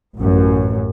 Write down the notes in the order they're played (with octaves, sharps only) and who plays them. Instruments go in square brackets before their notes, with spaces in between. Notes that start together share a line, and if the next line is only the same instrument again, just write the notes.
[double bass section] A1 F#2